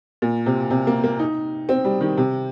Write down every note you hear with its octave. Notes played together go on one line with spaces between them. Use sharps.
A#2
C3
C3
A#3
A#3
D#4
C4
G3
D#3
C3